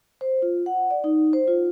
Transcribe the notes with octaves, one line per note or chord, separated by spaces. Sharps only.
C5
F4
F#5
D5
D#4
C5
F4